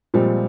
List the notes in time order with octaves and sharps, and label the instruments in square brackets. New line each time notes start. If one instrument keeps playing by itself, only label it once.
[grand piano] A#2 F3 G#3 C4 [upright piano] G3